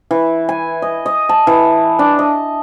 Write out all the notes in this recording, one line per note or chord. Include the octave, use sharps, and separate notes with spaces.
E3
G#5
D#5
D#5
A5
E3
D4
D#5